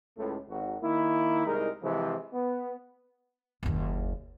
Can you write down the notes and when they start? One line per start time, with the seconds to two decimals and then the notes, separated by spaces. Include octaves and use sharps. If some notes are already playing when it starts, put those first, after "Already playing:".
0.17 C#2 A2
0.49 G#1 F#4
0.82 D#3 A#3 E4
1.47 C2 G#3 D#4 A#4
1.83 C3 E3 F3 G#3
2.33 B3
3.63 F#1 D#2